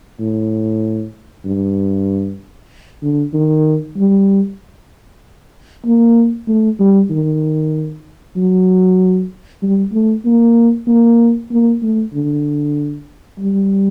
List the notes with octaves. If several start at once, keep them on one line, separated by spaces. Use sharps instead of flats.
A2
G2
D3
D#3
G3
A#3
A3
G3
D#3
F#3
G3
A3
A#3
A#3
A#3
A3
D3
G3